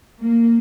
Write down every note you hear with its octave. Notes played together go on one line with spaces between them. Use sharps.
A#3